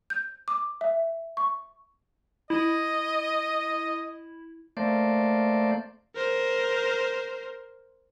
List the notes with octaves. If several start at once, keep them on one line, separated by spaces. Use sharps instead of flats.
G6
D6
E5
C#6
E4 D#5
A3 A#3 C5 D5
A#4 C5